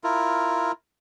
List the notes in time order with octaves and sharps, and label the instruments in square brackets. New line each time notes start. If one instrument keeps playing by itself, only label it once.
[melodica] E4 F4 A#4